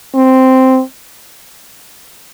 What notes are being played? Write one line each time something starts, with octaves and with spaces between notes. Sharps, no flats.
C4